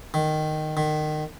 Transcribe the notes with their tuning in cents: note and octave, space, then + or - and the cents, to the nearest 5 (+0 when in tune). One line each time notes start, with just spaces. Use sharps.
D#3 -10
D#3 -25